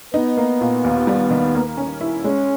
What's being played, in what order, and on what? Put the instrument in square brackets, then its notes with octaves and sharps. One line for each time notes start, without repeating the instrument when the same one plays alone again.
[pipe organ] B3 [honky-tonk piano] D#4
[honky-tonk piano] A#3
A#2
D#2
G3
D#3
A#3
C#4
E4
[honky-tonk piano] G#3 [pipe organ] C#4